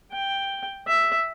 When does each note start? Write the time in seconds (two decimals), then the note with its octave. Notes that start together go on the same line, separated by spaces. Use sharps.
0.12 G5
0.88 E5